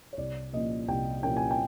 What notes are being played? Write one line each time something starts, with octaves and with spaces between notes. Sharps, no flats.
C#5
C2 D5
A#2 F3 A#3 C#4 D#5
C2 G5
A#2 F3 A#3 C#4 G5
G#5
G5